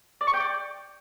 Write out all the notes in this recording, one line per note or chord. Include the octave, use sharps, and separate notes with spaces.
D5
C#6
G5
D5